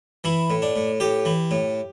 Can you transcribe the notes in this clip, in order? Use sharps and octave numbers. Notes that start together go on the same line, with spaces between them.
E3 E4
A2
D4
A2
A2 G4
E3
A2